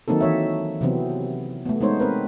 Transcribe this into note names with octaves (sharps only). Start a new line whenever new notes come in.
D#3 F#3 A#3 C4 D#4 A4
E3 C#5 E5
C3 E3 F#3 B3 C4
A3 B3
G#3 B3 D#4 C5 C#5
C4 A#4 B4